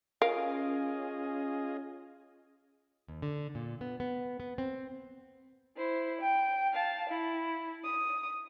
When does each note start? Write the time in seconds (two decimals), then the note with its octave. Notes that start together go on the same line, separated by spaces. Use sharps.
0.22 C#4 F4 G#4 A#4 D#5 F5
3.08 D#2
3.22 D3
3.55 A#2
3.81 B3
4.00 B3
4.40 B3
4.58 C4
5.77 E4 C5
6.21 G5
6.72 F5 A5
7.09 E4
7.84 D#6